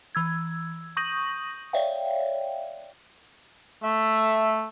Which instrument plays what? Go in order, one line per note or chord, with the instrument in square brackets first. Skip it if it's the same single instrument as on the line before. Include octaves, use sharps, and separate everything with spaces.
[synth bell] E3 E6 G#6
C#6 D#6 G6 A#6 D#7 F#7
C#5 D5 E5 F5 G5
[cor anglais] A3 [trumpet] E5